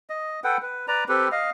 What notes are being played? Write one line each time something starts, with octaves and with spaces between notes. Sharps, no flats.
D#5
A4 B4 F#5 G5
B4
B4 D5 A#5
C4 G4 A4 B4
D#5 F5